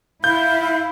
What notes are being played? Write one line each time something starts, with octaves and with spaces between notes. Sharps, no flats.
E4 F5 G6